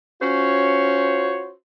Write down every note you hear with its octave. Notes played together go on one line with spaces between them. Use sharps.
C#4 F4 F#4 C5 C#5